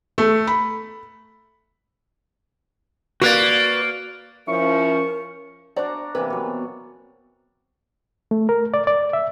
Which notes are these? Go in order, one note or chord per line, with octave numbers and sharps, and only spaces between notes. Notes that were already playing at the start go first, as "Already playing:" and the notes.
A3
B5
A#3 F#4 B4 D5
F3 C#4 E4 A#4 C#6
D4 F#4 C5 D5 A#5
C3 E3 A#3 B4
B2 F#3
A3
A#4
D5
D5
E5